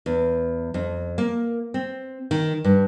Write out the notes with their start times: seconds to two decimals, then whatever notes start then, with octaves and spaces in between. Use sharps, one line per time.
0.06 E2
0.74 F2
1.18 A#3
1.74 C4
2.31 D#3
2.64 G2